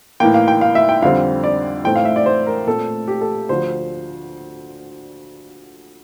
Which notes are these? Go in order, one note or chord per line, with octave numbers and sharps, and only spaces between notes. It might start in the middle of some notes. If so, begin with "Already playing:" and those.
A2 E3 A#3 G5
F5
G5
F5
E5
G5
F2 D3 G3 C4 F5
D5
A2 E3 A3 C4 G5
F5
E5
D5
C5
A#4
A#2 A3 C4 A4
G4
A4
D2 D3 F3 C5